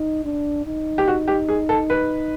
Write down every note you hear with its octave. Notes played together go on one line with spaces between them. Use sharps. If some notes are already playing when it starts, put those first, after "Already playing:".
Already playing: D#4
D4
D#4
G4
F#4
G4
G#4
A4
B4